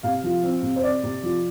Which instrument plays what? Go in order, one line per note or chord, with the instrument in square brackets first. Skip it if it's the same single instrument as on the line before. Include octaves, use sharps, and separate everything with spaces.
[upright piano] C3 F5
F3
C4
C3
C5
C4 D5
C3
F3